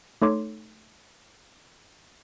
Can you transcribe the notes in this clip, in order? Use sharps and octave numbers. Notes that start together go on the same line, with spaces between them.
A3 D#4 A4 C#5 C6 D6